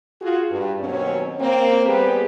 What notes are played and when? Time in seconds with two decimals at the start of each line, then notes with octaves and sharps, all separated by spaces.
0.22 F4 F#4 G#4
0.51 G2
0.80 D#2 B2 F#3 C4 C#4 C#5
1.40 A#3 C4
1.86 G3 B3 G4 G#4 B4 C5